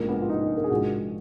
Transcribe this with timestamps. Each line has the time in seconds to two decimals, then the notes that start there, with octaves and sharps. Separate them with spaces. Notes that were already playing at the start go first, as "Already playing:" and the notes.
Already playing: A#1 G#2 F3 A#3
0.08 B3
0.22 F4
0.29 D#4
0.57 A#4
0.64 G#4
0.70 A#1 G#2 F3 F#4